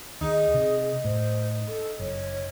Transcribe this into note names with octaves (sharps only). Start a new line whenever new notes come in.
D#2 D#4 G#4
C3
A2 C5
A4
F#1 C#5